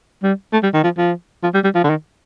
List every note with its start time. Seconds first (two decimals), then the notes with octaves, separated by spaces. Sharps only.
0.23 G3
0.53 A3
0.63 G3
0.74 D#3
0.84 F3
0.98 F3
1.43 F3
1.54 G3
1.64 G3
1.75 F3
1.84 D3
1.90 D#3